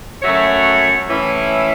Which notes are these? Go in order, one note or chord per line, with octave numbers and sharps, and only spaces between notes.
F#2 F#3 A3 F#4 C#5
A2 E3 C#4 E4